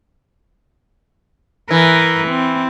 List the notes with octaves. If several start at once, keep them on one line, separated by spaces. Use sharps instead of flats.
E3 A#4 B4
C4